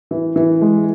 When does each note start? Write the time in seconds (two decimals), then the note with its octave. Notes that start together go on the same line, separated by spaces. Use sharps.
0.11 E3
0.36 E3
0.62 G#3